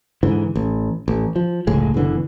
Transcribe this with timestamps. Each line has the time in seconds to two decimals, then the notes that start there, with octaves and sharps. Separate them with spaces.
0.23 G#2 D3 E3
0.56 A1
1.08 A1
1.36 F3
1.67 F1 C#2 A2 G#3
1.94 F#1 B2 D3 E3